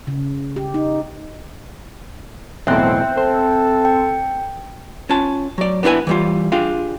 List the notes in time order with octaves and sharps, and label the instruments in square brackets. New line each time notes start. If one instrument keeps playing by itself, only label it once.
[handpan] C#3
G4
D#4
[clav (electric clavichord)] B1 E2 A2 [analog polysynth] C4 [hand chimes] E5 G5 F#6
[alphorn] A4 [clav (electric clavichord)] C5
[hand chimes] G5
[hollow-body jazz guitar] C#4 F4 A5
F#3 D5
B3 D4 E4 B4 G#5
E3 G3 F4
D4 F4 G4 G#4 F5